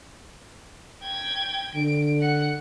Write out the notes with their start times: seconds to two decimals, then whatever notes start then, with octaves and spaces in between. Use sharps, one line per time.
1.03 G5 G#6
1.75 D3 D7
2.20 F#5 C#7